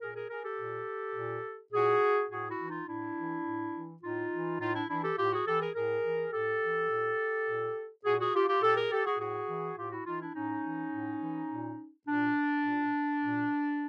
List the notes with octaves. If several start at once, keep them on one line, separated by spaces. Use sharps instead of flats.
A#2 G#4 A#4
G#4 A#4
G#4 A#4
G4 A4
A#2
A#2
A#2 F#4 G#4
A2 F#4 G#4
E4 F#4
E3
D#4 F4
A2 D4 E4
E3
A2
E3
A2 D#4 F4
E3
A2 D#4 F4
D4 E4
E3 D4 E4
G4 A4
A2 F4 G4
F#4 G#4
E3 G4 A4
G#4 A#4
A2 G#4 A#4
E3
A2 G4 A4
E3
A#2
A#2
A#2 F#4 G#4
F#4 G#4
F4 G4
F4 G4
A#2 G4 A4
G#4 A#4
G4 A4
F#4 G#4
A2 F#4 G#4
E3
A2 F4 G4
E4 F#4
E3 D#4 F4
D4 E4
A2 C#4 D#4
E3
A2
E3
A#2
A#2 D4
A#2
A#2